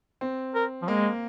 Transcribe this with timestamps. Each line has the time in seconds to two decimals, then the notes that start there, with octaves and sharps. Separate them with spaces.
0.21 C4
0.55 A#4
0.82 F3
0.88 G#3 A#3